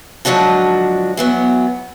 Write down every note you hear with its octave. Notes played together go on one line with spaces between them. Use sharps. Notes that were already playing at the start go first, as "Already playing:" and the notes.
G#2 D3 F3 F#3 D4 F#4
E3 F#3 B3